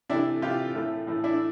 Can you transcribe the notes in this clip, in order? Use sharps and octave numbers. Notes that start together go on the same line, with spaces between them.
C3 E3 A3 D4 E4
C3 E3 A3 F4 G4
A2 E3 A3
A2 E3 A3
D4 E4